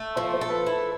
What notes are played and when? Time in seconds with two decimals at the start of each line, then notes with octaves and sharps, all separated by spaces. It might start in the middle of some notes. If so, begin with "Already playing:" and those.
Already playing: A3
0.16 F3 C5
0.33 C5
0.41 A4
0.50 B4
0.67 E4